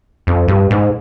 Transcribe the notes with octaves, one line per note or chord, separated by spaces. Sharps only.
F2
G2
G#2